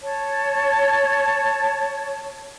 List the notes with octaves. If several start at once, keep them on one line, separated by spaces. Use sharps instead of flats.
C#5 A5